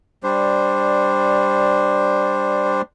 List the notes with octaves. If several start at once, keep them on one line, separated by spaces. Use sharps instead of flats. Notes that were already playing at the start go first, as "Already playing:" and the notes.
G3 D4 C5